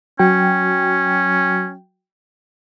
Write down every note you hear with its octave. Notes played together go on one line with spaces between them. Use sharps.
F#3 C#4 F#4 G5